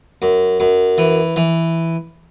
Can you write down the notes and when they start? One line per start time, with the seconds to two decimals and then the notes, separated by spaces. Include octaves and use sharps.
0.22 F#2
0.60 F#2
0.98 E3
1.36 E3